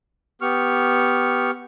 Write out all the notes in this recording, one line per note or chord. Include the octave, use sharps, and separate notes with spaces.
B3 G4 C#6 F6